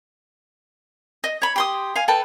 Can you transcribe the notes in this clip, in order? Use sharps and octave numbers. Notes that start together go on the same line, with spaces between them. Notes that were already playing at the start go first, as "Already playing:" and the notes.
D#5
C#5 B5
G4 C6 D#6
F5 G#5
A4 B4 G5 A5